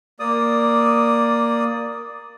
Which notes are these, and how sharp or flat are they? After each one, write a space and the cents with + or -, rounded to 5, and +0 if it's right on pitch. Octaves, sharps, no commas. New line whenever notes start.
A#3 +0 D5 +0 D#6 +0